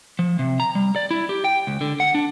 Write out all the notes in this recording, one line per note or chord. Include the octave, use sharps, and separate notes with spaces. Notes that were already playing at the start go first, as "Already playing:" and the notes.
F3
C3
A#5
G3
D5
E4
G4
G5
C#2
D3
F#5
D4